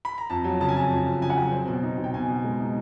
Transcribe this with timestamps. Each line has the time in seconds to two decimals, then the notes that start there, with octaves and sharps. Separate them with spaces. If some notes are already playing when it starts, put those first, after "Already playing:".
0.05 B5
0.18 A#5
0.30 F2 A5
0.44 F#3
0.60 C#3 A5
0.69 G#5
0.75 F2 A5
0.91 F2
1.07 F2
1.21 C#3 G#5
1.30 F#5
1.37 F#3 G5
1.52 C4
1.68 B2
1.83 D#4
1.98 B2
2.04 G5
2.14 B2 G#5
2.29 B2
2.44 G#3
2.60 D#4